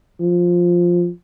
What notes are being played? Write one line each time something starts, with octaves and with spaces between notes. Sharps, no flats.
F3